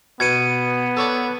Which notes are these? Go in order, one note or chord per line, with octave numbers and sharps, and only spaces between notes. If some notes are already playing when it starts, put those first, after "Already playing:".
B2 B3 G#6 C#7 D#7
A4 C#5 D5